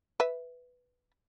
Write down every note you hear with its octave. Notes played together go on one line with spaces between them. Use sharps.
B4 E5